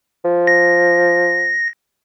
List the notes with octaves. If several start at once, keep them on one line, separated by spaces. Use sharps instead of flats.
F3
A#6